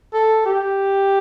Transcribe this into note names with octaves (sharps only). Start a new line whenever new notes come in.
A4
G4